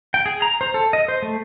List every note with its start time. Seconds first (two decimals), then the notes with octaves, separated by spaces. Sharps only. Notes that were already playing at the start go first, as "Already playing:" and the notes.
0.14 G5
0.26 G#4
0.42 A#5
0.61 C5
0.74 A4
0.93 D#5
1.08 C5
1.22 A3